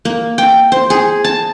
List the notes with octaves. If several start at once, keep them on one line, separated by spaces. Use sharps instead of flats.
A#3
G5
C5
G#4
A5